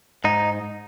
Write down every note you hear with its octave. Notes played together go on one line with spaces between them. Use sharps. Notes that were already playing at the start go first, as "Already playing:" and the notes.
G#2 D#4